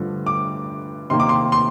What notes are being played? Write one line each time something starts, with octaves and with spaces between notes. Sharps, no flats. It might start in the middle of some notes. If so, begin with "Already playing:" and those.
Already playing: G2 D3 F3 A3
D6
C3 D#3 A#3 C6
D6
C6
C6